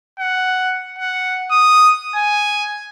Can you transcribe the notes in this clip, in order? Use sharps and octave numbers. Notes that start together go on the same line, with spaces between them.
F#5
F#5
D#6
G#5